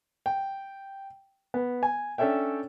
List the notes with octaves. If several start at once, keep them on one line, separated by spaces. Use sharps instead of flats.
G5
B3
G#5
C#4 D4 A4 C#5 E5 G5